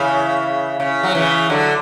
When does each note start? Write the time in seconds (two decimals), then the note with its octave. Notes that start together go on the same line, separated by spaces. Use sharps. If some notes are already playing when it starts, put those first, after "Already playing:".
Already playing: C#3 E3
0.80 C#3
1.03 F#3
1.15 C#3 E3
1.50 D3 F#3